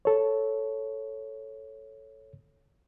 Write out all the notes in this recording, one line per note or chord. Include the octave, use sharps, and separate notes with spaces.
A4 C#5